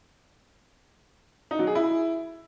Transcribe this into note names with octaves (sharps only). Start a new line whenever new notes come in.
D#4
F#3
G#4
E4